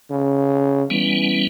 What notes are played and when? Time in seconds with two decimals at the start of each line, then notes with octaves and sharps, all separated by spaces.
0.10 C#3
0.90 E3 G3 B3 C#4